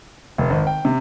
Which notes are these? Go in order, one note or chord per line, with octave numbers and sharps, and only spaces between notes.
F1
G#1
G5
C3